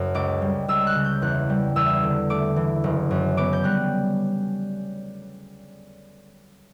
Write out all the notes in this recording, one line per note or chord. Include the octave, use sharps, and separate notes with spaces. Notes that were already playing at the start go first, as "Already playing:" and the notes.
Already playing: F#1 F#2
C#2 D6
G3
C#2 E6
F#6
C#3
G6
E2 F#6
G3
E2 E6
D3
A3 D6
E3
F#1
F#2
B3 D6
G6
G3 F#6